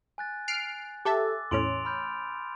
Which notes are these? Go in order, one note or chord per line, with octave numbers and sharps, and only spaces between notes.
G#5 F#6 A6
F6 C7 D7
G4 A4 E5 D6 E6 A6
E2 A2 C#4 C6 D7 F7
B5 F6 G6